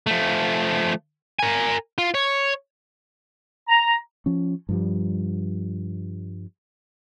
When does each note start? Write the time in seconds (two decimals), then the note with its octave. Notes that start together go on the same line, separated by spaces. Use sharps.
0.07 F3 A3
1.39 A#4 G#5
1.98 F4
2.14 C#5
3.69 A#5
4.26 F3 C#4
4.69 G2 F3 G3